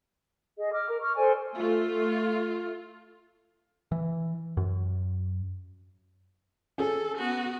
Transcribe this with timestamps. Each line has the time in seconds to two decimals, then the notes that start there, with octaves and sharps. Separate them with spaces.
0.57 G#4 D#5
0.72 D6 F6
0.88 A#4
1.00 C#6 F6
1.16 A4 C5 D5 G#5
1.55 A3 F4
3.92 E3
4.57 F#2
6.78 C#4 G#4 A4
7.18 B3 F#4